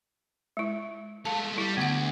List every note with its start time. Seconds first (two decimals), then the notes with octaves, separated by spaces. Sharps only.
0.57 G#3 E4
1.25 G#3 A3 F5 A5
1.58 G3 E4
1.77 D2 B3 F#5